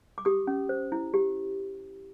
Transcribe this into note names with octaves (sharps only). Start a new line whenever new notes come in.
D6
G4 D#6
C#4
C5
E4
G4